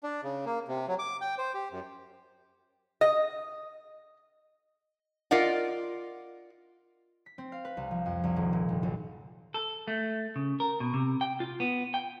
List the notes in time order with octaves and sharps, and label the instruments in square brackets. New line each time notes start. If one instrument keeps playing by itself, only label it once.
[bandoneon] D4
C#3
A#3
C3
F#3
D6
G5
C5
G4
F#2
[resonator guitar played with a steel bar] D#5
F4 A#4 D5 D#5 F#5
[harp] B6
C4
F5
B4
C2
F3
F2
C2
D#1
A#2
G1
B1
[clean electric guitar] A4
A3
C#3
A#4
B2
C3
G5
F4
B3
G5